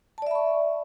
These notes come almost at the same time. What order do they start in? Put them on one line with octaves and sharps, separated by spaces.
A5 D5 E5 B5 C#6